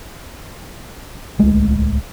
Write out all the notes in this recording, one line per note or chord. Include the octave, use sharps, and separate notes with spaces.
D1 C2 G#3 A3